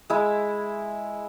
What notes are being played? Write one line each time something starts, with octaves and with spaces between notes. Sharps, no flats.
G#3 E4